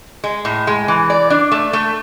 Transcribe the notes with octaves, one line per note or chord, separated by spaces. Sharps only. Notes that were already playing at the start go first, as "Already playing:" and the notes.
G#3
A2
G#3
E3
D5
D4
A3
A3